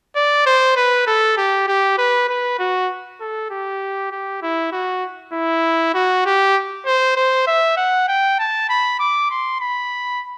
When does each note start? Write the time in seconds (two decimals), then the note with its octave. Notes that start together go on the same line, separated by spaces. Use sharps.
0.16 D5
0.46 C5
0.77 B4
1.07 A4
1.38 G4
1.67 G4
1.98 B4
2.29 B4
2.59 F#4
3.20 A4
3.51 G4
4.12 G4
4.42 E4
4.72 F#4
5.33 E4
5.95 F#4
6.26 G4
6.86 C5
7.17 C5
7.47 E5
7.77 F#5
8.08 G5
8.39 A5
8.70 B5
9.00 D6
9.31 C6
9.61 B5